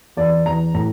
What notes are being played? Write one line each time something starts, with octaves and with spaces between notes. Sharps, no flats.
E2 D5
E2 A#5
A2 A#5